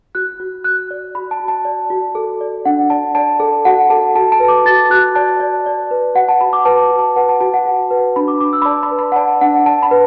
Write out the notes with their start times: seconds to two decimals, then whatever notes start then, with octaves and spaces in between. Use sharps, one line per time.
0.15 F#4 F#6
0.40 F#4
0.64 F#4 F#6
0.91 D5
1.15 F#4 B5
1.31 A5
1.40 F#4
1.48 A5
1.65 D5
1.90 F#4
2.15 A4
2.41 D5
2.65 D4 F#5
2.90 D5 A5
3.15 D5 A5
3.40 A4
3.65 F#4 F#5
3.90 A4 A5
4.15 F#4 A5
4.32 A5
4.40 B4
4.48 D6
4.65 F#4 A6
4.90 F#4 F#6
5.15 D5 A5
5.40 D5
5.66 D5
5.91 B4
6.15 F#4 F#5
6.29 A5
6.41 F#4 B5
6.53 D6
6.65 B4 A5
6.91 F#4
6.99 A5
7.16 B4 F#5
7.29 A5
7.41 F#4 A5
7.54 F#5
7.66 F#4
7.91 B4
8.16 D4 B5
8.28 D6
8.40 D4 D6
8.53 E6
8.62 B5
8.65 D5 A5
8.83 B5
8.91 B4
8.99 B5
9.12 F#5
9.16 D5 A5
9.41 D4 F#5
9.66 D5 A5
9.83 B5
9.91 B4